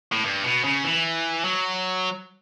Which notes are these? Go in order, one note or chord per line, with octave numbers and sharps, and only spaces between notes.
A2
G2
B2
C#3
E3
F#3